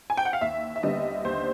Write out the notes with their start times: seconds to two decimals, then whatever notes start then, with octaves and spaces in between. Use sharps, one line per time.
0.10 G#5
0.17 G5
0.25 F#5
0.33 F5
0.41 D#2 E5
0.76 E5
0.83 D3 G3 B3 D#5
1.25 D#2 C5